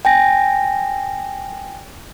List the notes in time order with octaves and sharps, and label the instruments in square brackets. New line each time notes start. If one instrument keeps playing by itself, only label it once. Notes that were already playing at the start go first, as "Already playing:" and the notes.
[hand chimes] G5 G#5 A#6